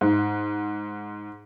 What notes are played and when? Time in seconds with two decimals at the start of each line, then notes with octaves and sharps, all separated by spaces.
0.01 G#2